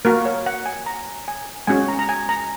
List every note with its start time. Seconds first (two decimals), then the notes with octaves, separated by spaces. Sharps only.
0.05 A#3 F#4 A#4
0.25 C#5
0.46 F#5
0.66 G#5
0.86 A#5
1.28 G#5
1.67 G#3 C#4 F#4 G#5
1.88 A#5
1.99 A#5
2.09 G#5
2.29 A#5